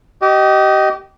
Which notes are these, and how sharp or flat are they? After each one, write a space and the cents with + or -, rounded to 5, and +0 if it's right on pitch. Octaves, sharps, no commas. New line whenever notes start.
G4 -30 D#5 +0